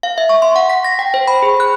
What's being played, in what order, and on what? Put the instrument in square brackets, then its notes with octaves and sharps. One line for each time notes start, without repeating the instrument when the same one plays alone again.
[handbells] F5
E5
C#6
C6
F#5
B6
A#6
G5
C5
B5
G#4
F#6